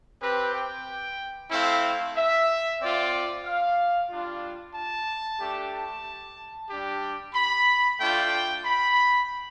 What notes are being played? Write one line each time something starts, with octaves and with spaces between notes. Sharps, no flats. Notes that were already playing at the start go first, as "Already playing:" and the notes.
C4 G4 B4
G5
A3 C4 E4 F5
E5
C4 F4 D5
F5
G3 D4 F4
A5
A3 D4 G4
A5
G3 D4 G4
B5
A3 D4 F4 G5
B5